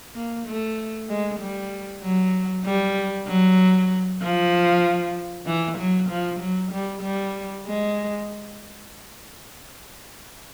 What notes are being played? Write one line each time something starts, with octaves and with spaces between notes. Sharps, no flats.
A#3
A3
G#3
G3
F#3
G3
F#3
F3
E3
F#3
F3
F#3
G3
G3
G#3